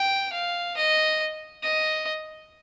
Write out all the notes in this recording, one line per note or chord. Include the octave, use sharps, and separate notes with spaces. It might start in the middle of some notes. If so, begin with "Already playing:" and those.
Already playing: G5
F5
D#5
D#5